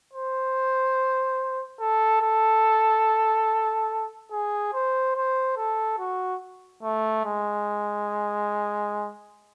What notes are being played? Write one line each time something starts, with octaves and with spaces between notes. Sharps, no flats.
C5
A4
A4
G#4
C5
C5
A4
F#4
A3
G#3